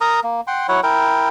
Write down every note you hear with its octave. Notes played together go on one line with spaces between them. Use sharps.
A#4 A#5 D#6
A#3
F#5 G5 C6
F#3 E4 C#5 F#5
E4 A#4 G5